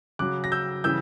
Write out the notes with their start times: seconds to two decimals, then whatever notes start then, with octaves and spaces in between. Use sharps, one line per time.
0.19 C#3 F#3 D6 F#6
0.44 A#6
0.52 E6 G6
0.84 C#3 E3 G3 E6 G6